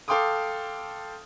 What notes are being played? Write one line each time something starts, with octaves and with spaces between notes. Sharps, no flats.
A4 F5 G5 C6 D6 D#6